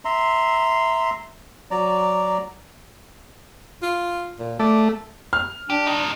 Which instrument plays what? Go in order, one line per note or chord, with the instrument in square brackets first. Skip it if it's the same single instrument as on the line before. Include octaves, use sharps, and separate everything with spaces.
[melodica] E5 A#5 C6
F#3 D5 A#5
[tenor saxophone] F4
A#2
[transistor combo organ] A3 [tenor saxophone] D5
[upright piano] F6
[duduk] D4 [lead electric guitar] G4
[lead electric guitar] G2 D#4